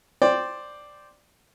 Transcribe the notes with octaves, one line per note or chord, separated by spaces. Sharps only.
C5 D5 G5